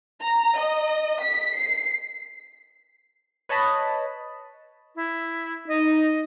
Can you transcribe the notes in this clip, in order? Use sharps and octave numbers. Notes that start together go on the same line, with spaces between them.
A#5
D#5
B6
C7
B4 C#5 D#5 A5 B5
E4
D#4 D#5